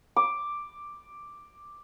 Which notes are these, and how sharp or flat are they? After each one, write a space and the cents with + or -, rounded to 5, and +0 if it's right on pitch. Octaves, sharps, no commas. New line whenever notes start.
D6 +5